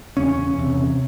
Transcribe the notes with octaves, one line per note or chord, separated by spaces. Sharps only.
E2 C#3 C#4
E2 C3